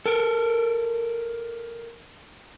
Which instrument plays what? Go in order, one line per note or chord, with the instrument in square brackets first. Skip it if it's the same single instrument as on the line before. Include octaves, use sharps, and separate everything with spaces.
[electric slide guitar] A4 A#4